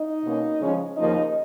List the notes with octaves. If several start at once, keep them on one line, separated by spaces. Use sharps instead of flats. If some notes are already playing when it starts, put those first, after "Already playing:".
Already playing: D#4 D#5
B2 A#3 C#4
C#3 F3 G#3 C#4
D#2 C#3 F3 A#3 D#4 D#5